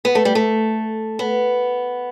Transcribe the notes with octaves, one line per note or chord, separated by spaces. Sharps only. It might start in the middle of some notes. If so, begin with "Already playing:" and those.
B3
A3
G3
A3
B3